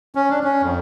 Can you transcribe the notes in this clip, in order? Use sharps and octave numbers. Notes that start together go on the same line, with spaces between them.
C#4
D4
C#4
F2